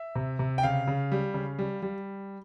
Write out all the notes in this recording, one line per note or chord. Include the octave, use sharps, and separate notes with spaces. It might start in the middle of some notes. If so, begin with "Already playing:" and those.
Already playing: E5
C3
C3
G5
C#3 F5
C#3
G3
C#3
G3
G3